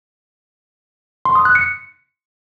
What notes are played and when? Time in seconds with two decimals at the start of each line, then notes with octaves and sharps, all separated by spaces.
1.25 C6
1.35 D#6
1.45 F#6
1.55 C#7